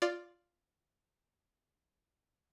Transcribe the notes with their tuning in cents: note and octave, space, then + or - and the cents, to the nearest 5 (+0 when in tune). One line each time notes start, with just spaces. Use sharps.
F4 +0 D5 +0